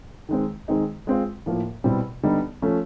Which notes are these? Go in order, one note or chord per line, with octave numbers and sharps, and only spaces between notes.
D#3 G#3 C4
D#3 G#3 C4 D#4 G#4
G#3 C4 F4
A2 F3 A#3
B2 G3 C4 E4
D3 G3 B3 D#4
F3 A3 C#4